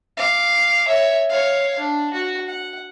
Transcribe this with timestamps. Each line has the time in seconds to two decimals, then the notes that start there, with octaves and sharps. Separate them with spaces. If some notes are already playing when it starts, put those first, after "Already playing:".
0.17 F5 D6
0.87 C#5 E5
1.29 C#5 F5
1.79 D4
2.13 F#4
2.46 F#5